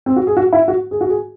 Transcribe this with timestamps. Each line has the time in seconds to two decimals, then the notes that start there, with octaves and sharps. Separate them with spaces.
0.06 C4
0.16 F#4
0.27 G#4
0.37 F#4
0.53 E4
0.68 F#4
0.91 G#4
1.01 F#4
1.09 G#4